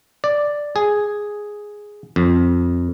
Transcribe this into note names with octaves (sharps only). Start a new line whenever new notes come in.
D5
G#4
F2